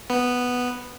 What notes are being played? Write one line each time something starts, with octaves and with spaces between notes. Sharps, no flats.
B3